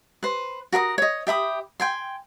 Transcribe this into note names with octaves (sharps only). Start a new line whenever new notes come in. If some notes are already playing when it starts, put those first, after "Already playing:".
B4 C5
F#4 A#4 B5 D#6
C#5 D#5
G4 E5 B5 D#6
G5 G#5 C6